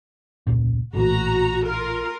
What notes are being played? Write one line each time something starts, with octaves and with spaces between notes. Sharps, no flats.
E1 C#2 A#2
A#1 A2 E3 F#4 A#5
F4 A#4